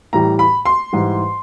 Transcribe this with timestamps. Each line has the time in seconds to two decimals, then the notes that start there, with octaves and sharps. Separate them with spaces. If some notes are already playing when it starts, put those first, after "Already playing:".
0.13 A2 E3 G3 A#5
0.39 B5
0.66 C6
0.93 G#2 E3 G3